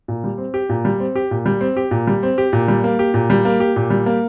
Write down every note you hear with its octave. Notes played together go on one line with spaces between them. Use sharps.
A#2
G3
C4
G4
A#2
G3
C4
G4
A#2
G3
C4
G4
A#2
G3
C4
G4
A#2
G3
A#3
G4
A#2
G3
A#3
G4
A#2
G3
A#3